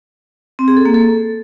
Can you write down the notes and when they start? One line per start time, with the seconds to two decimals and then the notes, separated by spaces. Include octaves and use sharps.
0.59 C4
0.68 G#4
0.77 A4
0.85 A#3
0.94 A4